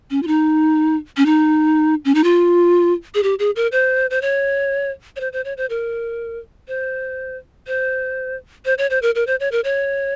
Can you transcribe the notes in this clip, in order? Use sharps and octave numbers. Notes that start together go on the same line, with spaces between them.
C#4
F4
D#4
C#4
D#4
C#4
D#4
F4
G#4
G4
G#4
A#4
C5
C5
C#5
C#5
C5
C5
C#5
C5
A#4
C5
C5
C5
C#5
C5
A#4
A#4
C5
C#5
A#4
C#5